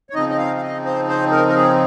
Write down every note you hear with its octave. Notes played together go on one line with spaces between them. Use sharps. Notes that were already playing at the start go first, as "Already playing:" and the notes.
C#5
C#3 F3 C4 D#4 D#5
D#5
F5
F5
D#5
C5
C5
A#4
A#4
G#4